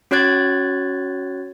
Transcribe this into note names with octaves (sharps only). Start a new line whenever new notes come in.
C#4 F#4 C#5 F#6 G#6 A6